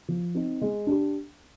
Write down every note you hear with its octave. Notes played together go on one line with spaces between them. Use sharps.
F3
C4 D#4
G#3
D4 G4